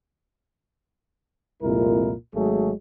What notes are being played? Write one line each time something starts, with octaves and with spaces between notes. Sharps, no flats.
C2 F2 A#2 G#3 E4 A#4
G#1 F#3 G#3 A3 G#4